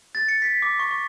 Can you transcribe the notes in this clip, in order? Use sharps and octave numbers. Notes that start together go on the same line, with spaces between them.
A6
C#7
B6
D6
C#6
C#6